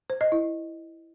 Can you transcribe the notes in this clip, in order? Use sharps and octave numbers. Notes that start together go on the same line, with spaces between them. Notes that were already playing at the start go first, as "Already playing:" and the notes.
C5
D#5
E4